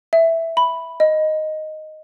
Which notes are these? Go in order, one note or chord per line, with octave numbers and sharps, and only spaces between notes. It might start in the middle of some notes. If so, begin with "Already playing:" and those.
E5
B5
D#5